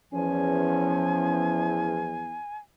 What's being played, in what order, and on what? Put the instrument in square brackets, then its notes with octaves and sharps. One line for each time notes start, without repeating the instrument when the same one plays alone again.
[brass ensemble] E2 [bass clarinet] F3 [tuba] C#4 [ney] G#5